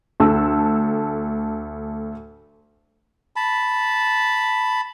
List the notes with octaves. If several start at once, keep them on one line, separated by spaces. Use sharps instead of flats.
D2 A4 E6
A5 B5